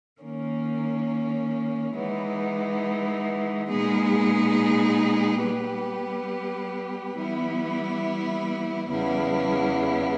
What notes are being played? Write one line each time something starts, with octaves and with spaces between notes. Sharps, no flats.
D#3 A#3 C#4
E3 G#3 B3 D#4
A#2 G#3 B3 D#4 G#4
G3 B3 G4 B4
E3 G3 B3 E4
E2 C#3 G3 B3 E4